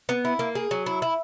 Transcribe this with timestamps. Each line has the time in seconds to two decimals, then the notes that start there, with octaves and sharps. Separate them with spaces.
0.09 B3
0.25 E4
0.39 A#3
0.55 G#4
0.71 F#3
0.86 E4
1.02 E4